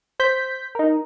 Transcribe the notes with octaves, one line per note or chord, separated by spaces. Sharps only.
C5 G6 B6
D#4 A#4